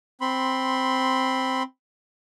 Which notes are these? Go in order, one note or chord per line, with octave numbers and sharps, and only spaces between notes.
C4 B5 C6